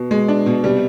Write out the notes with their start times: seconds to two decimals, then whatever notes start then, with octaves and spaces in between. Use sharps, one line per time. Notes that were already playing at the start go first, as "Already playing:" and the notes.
Already playing: B2
0.11 G#3
0.28 D4
0.46 B2
0.64 C3 G3